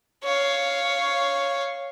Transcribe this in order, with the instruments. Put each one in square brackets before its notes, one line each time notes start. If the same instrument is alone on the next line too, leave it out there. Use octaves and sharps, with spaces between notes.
[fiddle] C#5 F5